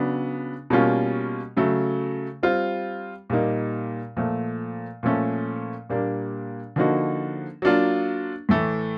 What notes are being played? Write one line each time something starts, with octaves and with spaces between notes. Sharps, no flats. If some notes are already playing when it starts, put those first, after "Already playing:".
Already playing: C#3 F#3 B3 D4
B2 G3 A#3 C#4 F4
C#3 F#3 A3
G3 C4 F4
A#2 G3 A#3 D#4
A#2 F3 A3
A#2 F3 A3 C#4
A#2 G3 A#3 D4
D3 F3 A#3 D#4 F#4
F#3 A#3 D4 F4
A2 E3 A3